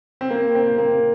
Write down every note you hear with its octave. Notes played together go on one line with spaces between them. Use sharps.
C4
A#3
C4
A#3